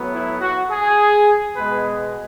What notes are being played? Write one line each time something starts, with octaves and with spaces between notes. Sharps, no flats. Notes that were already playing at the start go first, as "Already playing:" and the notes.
Already playing: A2 F#3 B3
E4
F#4
G#4
B2 G#3 B3 B4